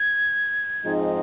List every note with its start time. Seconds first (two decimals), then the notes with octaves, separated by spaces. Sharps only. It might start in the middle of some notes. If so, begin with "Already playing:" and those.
Already playing: G#6
0.84 G#2 F3 G#3 C4 D#4